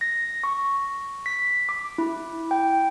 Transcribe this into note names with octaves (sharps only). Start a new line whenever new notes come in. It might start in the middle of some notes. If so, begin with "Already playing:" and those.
A#6
C#6
B6
D6
E4
G5